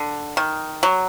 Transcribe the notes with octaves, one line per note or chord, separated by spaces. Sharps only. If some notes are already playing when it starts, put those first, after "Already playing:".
Already playing: D3
D#3
F#3